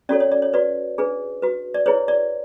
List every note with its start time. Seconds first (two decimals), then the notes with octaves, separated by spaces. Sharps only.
0.09 C#4 F#4 A4 C#5 D5
0.20 C#5
0.32 D5
0.42 C#5
0.53 F#4 B4 D5
0.98 D4 G#4 B4
1.42 F#4 B4
1.74 D5
1.86 E4 G#4 B4 C#5
2.08 D5